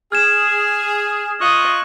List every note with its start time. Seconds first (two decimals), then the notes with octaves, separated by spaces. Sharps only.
0.12 G#4 F6 G#6 E7
1.41 F4 D#5 C#6 F#6